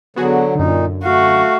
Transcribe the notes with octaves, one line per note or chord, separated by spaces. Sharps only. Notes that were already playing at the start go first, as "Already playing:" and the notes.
D3 F#3 B3 F#4 G#4
F#2 A#2 D3 D#4
A3 F#4 F5